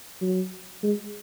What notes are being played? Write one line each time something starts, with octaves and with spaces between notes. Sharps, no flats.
F#3
G#3